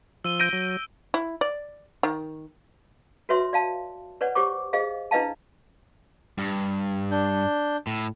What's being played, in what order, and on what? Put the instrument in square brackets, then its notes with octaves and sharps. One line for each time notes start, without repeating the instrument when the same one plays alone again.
[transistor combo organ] F3 [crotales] E6 D#7 G7
[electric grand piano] G6 A#6 D#7 [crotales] D7
[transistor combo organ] F#3
[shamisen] E4
D5
D#3
[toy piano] F#4 B4 C#5 E5 C6
D5 F5 A5
B4 C#5 D5 F#5
G4 C5 C#5 C#6 D6
G#4 C5 D#5 F5
D4 E4 B4 D#5 F5 A5
[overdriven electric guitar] G2
[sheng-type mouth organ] D4 G6
[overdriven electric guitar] A2